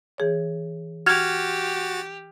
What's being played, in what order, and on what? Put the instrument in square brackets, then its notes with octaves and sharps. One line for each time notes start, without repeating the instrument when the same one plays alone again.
[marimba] E3 G#4 C#5
[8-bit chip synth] F#4 A6 [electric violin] G4 [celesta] F6 G#6 F7